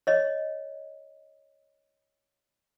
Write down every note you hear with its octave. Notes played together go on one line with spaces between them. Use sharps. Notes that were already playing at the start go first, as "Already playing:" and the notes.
C#5 D#5